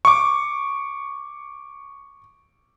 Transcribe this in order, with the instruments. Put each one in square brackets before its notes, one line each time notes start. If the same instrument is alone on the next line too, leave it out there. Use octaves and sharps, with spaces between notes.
[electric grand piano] C#6 D6